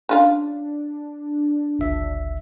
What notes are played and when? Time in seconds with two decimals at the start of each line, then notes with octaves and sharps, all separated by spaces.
0.09 C#3 D4 F4 F5
1.79 G1 C#2 E5